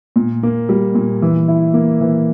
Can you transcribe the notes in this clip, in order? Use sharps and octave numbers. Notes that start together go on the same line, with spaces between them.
A#2
A#3
G3
A#2
E3
E4
A#3
E3